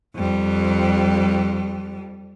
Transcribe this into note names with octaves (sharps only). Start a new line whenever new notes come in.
F2 G3